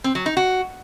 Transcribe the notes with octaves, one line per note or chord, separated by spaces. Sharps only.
C4
F#3
D#4
F#4